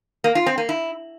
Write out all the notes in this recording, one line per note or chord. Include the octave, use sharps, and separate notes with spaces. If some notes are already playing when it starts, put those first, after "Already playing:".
A#3
F4
C4
A#3
E4